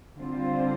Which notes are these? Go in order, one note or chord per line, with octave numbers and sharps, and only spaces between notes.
D3 G3 C4 F4 C5